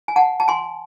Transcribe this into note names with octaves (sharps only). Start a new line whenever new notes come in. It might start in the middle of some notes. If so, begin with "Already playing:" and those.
G#5
F#5 A5
A5
G#5 C6